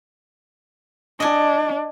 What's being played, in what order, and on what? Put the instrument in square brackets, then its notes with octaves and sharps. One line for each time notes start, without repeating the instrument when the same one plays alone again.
[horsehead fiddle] D4 [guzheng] D#5 G#5